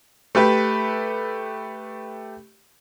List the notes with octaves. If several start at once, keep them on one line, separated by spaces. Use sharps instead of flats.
A3 G4 B4